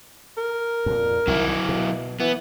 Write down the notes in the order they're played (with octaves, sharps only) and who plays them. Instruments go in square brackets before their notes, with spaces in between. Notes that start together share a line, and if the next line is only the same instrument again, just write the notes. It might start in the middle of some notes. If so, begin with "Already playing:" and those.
[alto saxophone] A#4
[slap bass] F2 A#2
[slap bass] C2 D#3 [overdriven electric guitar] F#3 E4
[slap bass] B2
[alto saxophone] E3 [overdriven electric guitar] B3